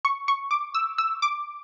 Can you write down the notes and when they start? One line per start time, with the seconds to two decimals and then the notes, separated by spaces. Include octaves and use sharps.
0.05 C#6
0.28 C#6
0.51 D6
0.74 E6
0.98 E6
1.22 D6